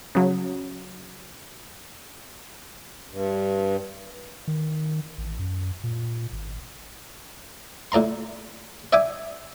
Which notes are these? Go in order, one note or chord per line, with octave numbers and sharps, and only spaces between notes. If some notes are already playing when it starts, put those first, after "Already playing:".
C#3 F#3
G2
D#3
A1
F#2
A#2
G#1
A2 D5 A#5 C6
D5 E5 G5 G#5 D6 D#6